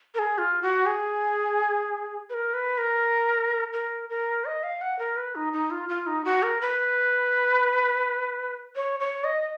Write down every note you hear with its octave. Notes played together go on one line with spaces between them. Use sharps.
A#4
G#4
F4
F#4
G#4
B4
A#4
B4
A#4
A#4
A#4
D#5
F5
F#5
A#4
B4
D#4
D#4
F4
F4
D#4
F#4
A#4
B4
C#5
C#5
D#5